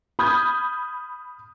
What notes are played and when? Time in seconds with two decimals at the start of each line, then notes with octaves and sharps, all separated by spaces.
0.19 B5 D#6 F6 G6 G#6